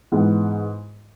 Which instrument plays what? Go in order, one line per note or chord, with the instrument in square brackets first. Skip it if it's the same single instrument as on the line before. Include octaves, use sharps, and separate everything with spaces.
[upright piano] G#2 E3 B3